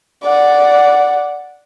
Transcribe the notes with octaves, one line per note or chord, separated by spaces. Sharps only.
D5 F#5